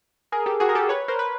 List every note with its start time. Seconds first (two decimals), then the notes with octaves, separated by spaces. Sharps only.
0.32 G#4 A#4
0.46 G4 A4
0.60 F#4 G#4
0.69 A#4
0.75 G4 A4
0.89 B4 C#5
1.08 A#4 C5
1.19 B4